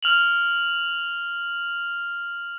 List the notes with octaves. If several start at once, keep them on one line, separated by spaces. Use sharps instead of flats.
F6 F7 F#7